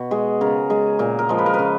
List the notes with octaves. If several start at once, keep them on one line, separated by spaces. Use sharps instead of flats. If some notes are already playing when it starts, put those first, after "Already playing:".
Already playing: B2 F#4
G#3 G#4
C#3 A#4
G#3 G#4
A#2 A#4
A#4
F3 G#3
B4
A#4
C#3 B4